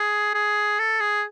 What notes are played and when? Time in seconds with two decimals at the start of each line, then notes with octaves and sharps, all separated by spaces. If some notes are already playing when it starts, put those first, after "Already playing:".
Already playing: G#4
0.34 G#4
0.79 A4
1.00 G#4